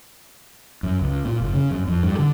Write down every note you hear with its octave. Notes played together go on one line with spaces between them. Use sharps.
F#2
C#2
A#2
F#1
C#3
F#2
F2
G2
D3